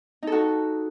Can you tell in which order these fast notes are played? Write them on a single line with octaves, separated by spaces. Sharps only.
D#4 A4 F#4